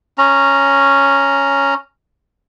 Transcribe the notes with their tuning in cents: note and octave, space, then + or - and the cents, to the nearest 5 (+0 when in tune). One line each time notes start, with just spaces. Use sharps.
C#4 +0 A#5 +0